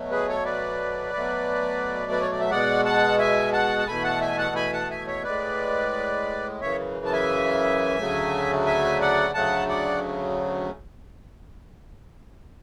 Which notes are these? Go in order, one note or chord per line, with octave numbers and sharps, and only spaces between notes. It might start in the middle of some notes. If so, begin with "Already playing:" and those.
Already playing: B2 F#3 A3
G#4 B4
A4 C#5
B4 D5
B2 F#3 A3
B4
C#5
D5
E5
B2 G#3 D5 F#5
F#5 A5
E5 G#5
F#5 A5
A5
E2 B2 A3 G#5 B5
F#5 A5
E5 G#5
F#5 A5
G#5 B5
F#5 A5
E5 G#5
C#5 E5
A2 G#3 B4 D5
F#2 C#3 E3 C#5 E5
A5
E5 G#5
D2 C#3 F#3 A3
E5 G#5
D5 F#5
D2 C#3 F#3 A3 F#5 A5
D5 F#5